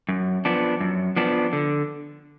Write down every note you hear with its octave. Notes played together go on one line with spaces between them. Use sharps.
F#2
F3 B3 D4
F#2
F3 B3 D4
D3